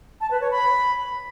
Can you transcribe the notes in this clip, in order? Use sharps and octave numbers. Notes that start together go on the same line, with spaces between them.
A5
B4
C#5
B5